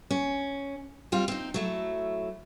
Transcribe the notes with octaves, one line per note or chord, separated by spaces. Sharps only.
C#4
G3 C4 F4
C4 D#4
F#3 A3 E4